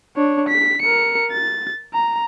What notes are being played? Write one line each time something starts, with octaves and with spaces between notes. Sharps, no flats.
D4 C#5
B6
A#4 C#7
A6
A#5